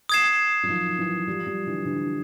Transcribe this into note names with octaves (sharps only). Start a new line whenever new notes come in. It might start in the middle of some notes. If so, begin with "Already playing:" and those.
D#6 G#6 C7 E7
F#3
D#3 F3
E3 F#3
F3 G3
F3 G3
D3 E3
D3 E3